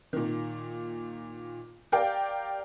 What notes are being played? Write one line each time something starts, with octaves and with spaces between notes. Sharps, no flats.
A#2 D#3
G4 A#4 D5 F5 G5